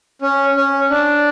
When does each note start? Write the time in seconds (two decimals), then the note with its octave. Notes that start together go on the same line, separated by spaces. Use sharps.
0.22 C#4
0.56 C#4
0.90 D4